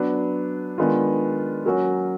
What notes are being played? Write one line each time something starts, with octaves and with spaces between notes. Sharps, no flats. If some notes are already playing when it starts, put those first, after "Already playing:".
Already playing: F#3 B3 D4
D#3 G#3 B3 D4 F4
F#3 A#3 C#4 F#4